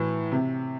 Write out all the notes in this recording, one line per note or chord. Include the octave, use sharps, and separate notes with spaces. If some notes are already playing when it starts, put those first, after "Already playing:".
Already playing: A2 E3
C3